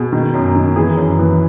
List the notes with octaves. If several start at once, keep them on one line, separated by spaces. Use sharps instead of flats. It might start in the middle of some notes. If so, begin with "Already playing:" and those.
Already playing: B2 G#4
D#3
F#2
D#3
E3 G#4
F#2
E3